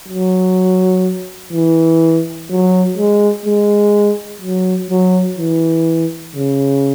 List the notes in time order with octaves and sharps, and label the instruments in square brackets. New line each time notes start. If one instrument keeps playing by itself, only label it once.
[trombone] F#3
E3
F#3
G#3
G#3
F#3
F#3
E3
C#3